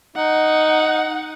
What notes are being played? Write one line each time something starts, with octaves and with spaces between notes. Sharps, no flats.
D#4 F#5